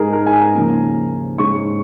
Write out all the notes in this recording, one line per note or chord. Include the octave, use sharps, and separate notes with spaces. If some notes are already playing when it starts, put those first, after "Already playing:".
Already playing: G#2 G#3 D#4 G#4 A#4
A#4
G#5
A#5
D#2 C#3 F3 A#3 C#4
G#2 G#3 C#4 C#6